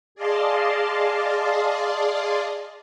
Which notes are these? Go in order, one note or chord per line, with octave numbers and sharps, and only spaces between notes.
G#4 D5 D#5 F5 A5 C6